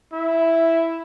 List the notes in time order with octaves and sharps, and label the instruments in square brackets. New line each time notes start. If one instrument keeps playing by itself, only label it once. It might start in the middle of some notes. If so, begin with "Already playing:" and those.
[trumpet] E4 [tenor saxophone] E5